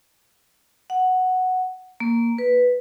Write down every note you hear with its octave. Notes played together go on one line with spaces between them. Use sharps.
F#5
A#3
B4